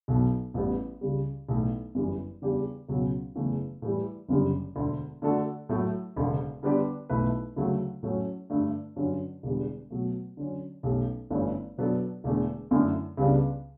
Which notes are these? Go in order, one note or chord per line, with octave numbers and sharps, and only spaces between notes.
B1 B2 F#3
A1 A2 G3 B3
C#2 C#3 G3
B1 A2 E3 A3
G1 F#2 E3 G3
E2 C#3 G3 D4 G4
C#2 B2 F#3 C#4
F#1 E2 C#3 E3 A3
A2 E3 G3
F#1 F#2 D3 G3
E1 D2 D3
D3 A3 D4 F#4 A4
A2 F#3 A3
E1 D2 C#3
D3 G3 B3 D4 G4
B1 B2 A3 E4 B4
D2 C#3 F#3 A3
A2 F#3 A3 C#4
G2 D3 A3 D4
G2 D3 F#3 C#4
E1 E2 D3 G3
B2 F#3 A3
D3 F#3 C#4
B1 B2 A3 C#4 G4
G1 G2 E3 A3 C#4
B2 F#3 B3 D4 A4
E1 E2 D3 A3
F#2 D3 A3 E4
C#2 C#3 G3 B3 D4